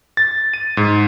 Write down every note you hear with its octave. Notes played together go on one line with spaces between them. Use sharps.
A6
D#7
G#2